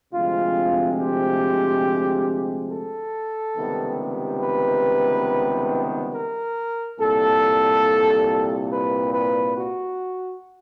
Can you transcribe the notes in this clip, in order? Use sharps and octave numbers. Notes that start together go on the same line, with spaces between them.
D2 C3 F3 G#3 C4 F4
G4
A4
C#2 C3 D#3 G3 B3
B4
A#4
C2 A#2 G3 A4
B4
B4
F#4